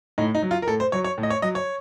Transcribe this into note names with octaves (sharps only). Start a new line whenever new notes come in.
A2 D#4
D#4
F#3
F4
A#4
A2 A4
C5
F#3 C#5
C#5
A2
D#5
C#5
F#3 D#5
C#5